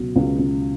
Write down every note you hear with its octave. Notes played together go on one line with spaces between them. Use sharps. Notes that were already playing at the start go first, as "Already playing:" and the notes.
Already playing: C#2 B2 F#3
C#2
C#2